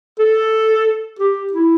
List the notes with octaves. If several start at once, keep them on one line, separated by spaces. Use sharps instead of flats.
A4
G4
E4